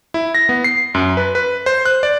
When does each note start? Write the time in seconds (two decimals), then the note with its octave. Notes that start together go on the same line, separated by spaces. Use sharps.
0.14 E4
0.35 A#6
0.49 B3
0.64 C7
0.95 F#2
1.17 B4
1.35 B4
1.66 C5
1.86 F#6
2.03 D5